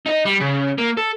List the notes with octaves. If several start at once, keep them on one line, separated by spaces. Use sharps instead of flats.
D#4 D#5
G3
C#3
A#3
A4